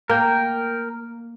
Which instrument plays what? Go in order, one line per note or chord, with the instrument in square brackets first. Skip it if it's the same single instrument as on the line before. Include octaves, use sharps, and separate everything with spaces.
[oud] A#3 [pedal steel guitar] A#4 G5